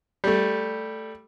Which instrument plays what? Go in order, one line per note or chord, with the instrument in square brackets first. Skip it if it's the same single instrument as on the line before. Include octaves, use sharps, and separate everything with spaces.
[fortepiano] G3 A3